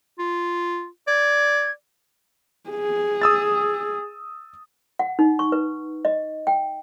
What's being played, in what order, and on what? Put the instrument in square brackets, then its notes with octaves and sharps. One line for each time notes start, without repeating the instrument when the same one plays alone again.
[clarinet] F4
[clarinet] D5 [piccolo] G#6
[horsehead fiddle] G#4
[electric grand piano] D#6 E6 A6
[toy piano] F#5
D#4
C#6
B4
D#5
G5